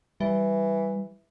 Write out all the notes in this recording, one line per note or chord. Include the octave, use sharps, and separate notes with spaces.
E3 G3